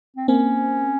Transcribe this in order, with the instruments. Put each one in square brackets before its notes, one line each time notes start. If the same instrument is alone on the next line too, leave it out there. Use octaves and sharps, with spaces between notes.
[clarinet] C4
[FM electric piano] A#3 C4 [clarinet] C#4